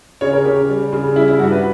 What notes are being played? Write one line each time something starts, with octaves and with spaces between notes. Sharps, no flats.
C#3 C#5
A#4
C#3 G4
G3
C#3
G3 E4
E4
G2 F#4
B4